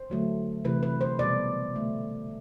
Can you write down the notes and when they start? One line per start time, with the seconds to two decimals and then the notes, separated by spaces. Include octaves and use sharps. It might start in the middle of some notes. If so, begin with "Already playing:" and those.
Already playing: C5
0.10 D3 F#3 A3
0.65 C3 E3 A3 B4
0.83 B4
1.01 C5
1.19 B2 G3 D5
1.75 D3 A3